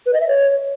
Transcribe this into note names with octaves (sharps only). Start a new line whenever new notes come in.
B4
D#5
E5
C#5